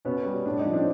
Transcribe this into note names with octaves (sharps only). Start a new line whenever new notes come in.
B2 B3 C#4
G3
A2 D4
D#4
F3
C4 D4